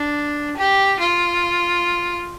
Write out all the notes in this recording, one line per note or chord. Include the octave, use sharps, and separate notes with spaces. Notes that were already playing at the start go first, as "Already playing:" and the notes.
Already playing: D4
G4
F4